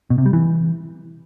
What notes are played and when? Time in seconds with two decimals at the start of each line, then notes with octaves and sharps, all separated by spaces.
0.10 B2
0.18 C3
0.26 G3
0.33 E3